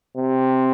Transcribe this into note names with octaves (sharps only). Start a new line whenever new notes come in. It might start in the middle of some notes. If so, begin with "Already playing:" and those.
C3